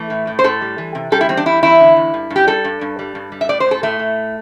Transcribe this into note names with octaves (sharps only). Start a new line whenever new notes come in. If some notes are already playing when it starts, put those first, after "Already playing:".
Already playing: E3 A3
A2
A2
C5
A2 A4
G3
E3
C3
G3 A4
E4
E2 C4
D4
G3 E4
E2 E4
D3
E2
G2
G2
G4
G3 A4
G2
G2
G3
G2
G3
E5
A2 D5
C5
A2
A4
A2 A3
A2